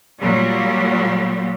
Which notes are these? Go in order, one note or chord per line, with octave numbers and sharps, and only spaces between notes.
A#2 F#3 G3